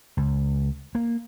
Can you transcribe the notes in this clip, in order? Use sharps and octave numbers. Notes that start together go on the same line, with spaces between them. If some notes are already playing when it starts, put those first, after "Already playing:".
C#2
A#3